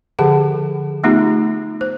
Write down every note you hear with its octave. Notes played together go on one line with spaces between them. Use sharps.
D3 F3 G4 G#4 F#5
A3 B3 D#4 F4 G4
C5